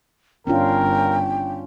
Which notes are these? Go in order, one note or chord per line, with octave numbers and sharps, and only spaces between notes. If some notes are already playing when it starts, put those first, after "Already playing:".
G1 C#4 D4 F4 A#4 G5